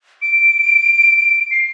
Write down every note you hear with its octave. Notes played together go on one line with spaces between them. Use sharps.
D7
C7